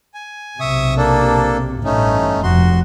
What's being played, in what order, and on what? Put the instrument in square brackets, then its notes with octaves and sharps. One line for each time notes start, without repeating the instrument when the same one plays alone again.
[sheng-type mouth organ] G#5
[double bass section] B1 C3 [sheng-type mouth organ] E5 C#6 D#6
[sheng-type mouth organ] A#3 D4 A4
[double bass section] A1 G2 [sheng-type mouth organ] A3 C#4 D#4
[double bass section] F1 [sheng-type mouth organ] F#4 C6